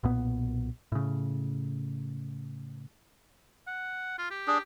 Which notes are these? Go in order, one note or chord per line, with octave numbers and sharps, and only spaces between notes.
B1 A#2 B3
A2 C#3
F#5
F4
G4
D4 G#4